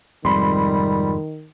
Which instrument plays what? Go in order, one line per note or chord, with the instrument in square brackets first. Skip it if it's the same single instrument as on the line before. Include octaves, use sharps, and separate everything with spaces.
[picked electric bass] F2 G#2 C3 [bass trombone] D#3 [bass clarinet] G3 [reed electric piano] B5 C6